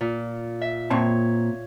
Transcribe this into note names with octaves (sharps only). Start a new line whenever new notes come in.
A#2
E5
A#2 C4 C#5 A5